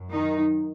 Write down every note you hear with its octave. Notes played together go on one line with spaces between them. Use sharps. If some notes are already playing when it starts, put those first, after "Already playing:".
Already playing: F#2
D#3 D#4